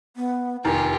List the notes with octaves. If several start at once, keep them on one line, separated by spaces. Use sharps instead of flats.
B3
F1 D#3 F4 G4 G#5 A#5